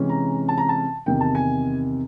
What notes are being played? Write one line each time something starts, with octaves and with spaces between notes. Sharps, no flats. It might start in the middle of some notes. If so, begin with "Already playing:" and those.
Already playing: C3 E3 G#3 C#4
A#5
A5
A#5
A5
E2 C3 D#3 G5
A5
G#5